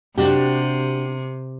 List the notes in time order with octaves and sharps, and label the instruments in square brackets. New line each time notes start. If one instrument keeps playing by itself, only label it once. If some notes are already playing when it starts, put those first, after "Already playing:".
[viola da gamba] C3 [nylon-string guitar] D4 F#4 G4